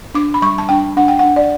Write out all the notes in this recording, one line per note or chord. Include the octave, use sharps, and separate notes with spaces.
D4 D6
B5
G3 C#6
A5
D4 G5
D4 F#5
G5
D4 F#5
D5